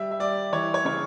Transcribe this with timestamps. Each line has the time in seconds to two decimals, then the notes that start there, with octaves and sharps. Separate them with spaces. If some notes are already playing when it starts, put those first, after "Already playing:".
Already playing: G3 E5
0.11 E5
0.20 G3 D5
0.53 E3 C#5
0.74 C#5
0.85 C#3 C#5